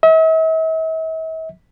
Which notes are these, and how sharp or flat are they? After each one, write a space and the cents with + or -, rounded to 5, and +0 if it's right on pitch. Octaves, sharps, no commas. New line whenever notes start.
E5 -45